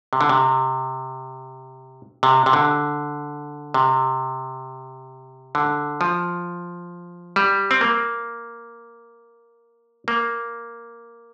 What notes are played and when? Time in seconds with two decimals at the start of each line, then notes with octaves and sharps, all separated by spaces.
0.13 C3
0.21 D3
0.29 C3
2.23 C3
2.46 C3
2.53 D3
3.74 C3
5.55 D3
6.01 F3
7.36 G3
7.71 C4
7.81 A#3
10.08 A#3